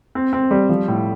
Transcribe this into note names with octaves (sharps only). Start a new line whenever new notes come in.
C4
C4
G3
F3
A2